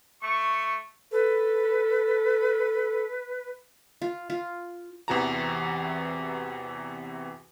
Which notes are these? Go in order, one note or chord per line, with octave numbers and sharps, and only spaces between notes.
A3 C#6
A4 B4
F4
F4
E2 C3 E3 F#4 A5 A#5